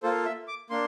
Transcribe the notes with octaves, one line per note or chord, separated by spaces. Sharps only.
A#3 F4 A4 C5
E5
D6
A#3 D4 C6